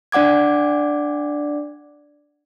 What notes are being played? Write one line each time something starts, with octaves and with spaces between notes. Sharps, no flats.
D4 D5 F#5 D6 G#6